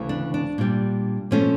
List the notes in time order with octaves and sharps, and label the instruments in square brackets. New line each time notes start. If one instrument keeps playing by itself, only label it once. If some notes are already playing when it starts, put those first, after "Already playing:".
Already playing: [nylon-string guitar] D2 C#3 E3
D4
D4
A#2 G3
A#2 F3 A3 C#4